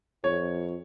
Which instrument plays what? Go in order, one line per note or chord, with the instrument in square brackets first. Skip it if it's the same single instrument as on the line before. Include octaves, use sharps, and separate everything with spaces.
[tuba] F2 [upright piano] C#5